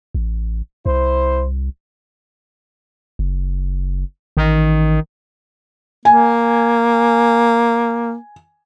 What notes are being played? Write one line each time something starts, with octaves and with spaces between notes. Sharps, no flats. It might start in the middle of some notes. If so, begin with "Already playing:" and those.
A1
C2 E4 C5
F#1
A1 D#3
A#3 G#5